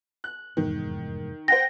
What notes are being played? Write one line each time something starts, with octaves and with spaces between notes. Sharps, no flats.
F#6
F1 E2 G#2 D#3
C5 F#5 G5 A#6